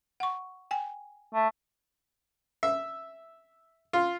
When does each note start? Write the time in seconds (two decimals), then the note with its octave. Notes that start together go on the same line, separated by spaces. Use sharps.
0.20 F#5 C#6
0.71 G5 G#5
1.34 A3
2.63 E5
3.93 F4